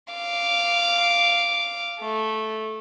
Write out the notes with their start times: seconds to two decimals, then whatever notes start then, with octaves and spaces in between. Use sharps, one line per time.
0.13 F5 D6
2.01 A3